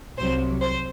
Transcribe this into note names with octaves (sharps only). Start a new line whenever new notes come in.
C2 C3 F#3 C5
C5